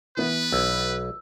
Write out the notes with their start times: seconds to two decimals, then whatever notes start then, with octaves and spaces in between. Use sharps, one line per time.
0.17 E3 B3 E4 B4
0.52 B1 E6